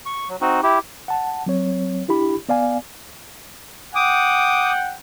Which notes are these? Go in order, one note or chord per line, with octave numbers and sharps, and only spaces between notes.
C#6
F#3
C4 D#4 F#4
E4 G4
F#5 A5
F#3 C4 C#5
D4 E4 G4 B5
B3 D5 F5 G#5
F#5 G5 D6 D#6